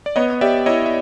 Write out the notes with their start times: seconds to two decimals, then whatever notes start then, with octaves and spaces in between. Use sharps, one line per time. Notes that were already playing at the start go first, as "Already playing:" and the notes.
0.06 D5
0.16 B3 C#5 D#5
0.41 G4 D5 E5
0.66 E4 C#5 D#5
0.86 E5